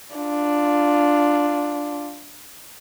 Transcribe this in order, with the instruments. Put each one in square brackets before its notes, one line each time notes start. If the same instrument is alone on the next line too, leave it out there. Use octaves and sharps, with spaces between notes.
[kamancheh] D4 F4